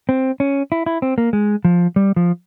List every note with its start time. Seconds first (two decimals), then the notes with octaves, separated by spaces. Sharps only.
0.09 C4
0.40 C#4
0.72 E4
0.86 E4
1.02 C4
1.18 A#3
1.33 G#3
1.65 F3
1.96 G3
2.16 F3